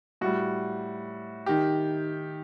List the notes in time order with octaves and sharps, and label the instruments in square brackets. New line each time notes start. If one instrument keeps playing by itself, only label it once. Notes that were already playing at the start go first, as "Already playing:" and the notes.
[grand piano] A2 G3 F#4
D#3 G4